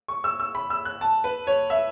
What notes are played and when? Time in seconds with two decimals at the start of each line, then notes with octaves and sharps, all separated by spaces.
0.08 C#6
0.24 E6
0.40 E6
0.55 B5
0.70 E6
0.85 F#6
1.01 A5
1.24 B4
1.47 C#5
1.70 E5